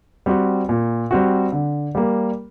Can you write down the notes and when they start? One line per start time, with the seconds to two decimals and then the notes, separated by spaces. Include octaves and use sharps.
0.26 G3 C4 F#4
0.69 A#2
1.11 G3 C4 F#4
1.52 D3
1.95 G3 A#3